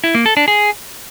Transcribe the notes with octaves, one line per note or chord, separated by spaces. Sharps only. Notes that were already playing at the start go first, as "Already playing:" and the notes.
E4
A#3
A4
D4
G#4